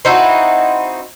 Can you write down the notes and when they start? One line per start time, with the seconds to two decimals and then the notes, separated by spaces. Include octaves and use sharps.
0.05 C4 D#4 E4 F#4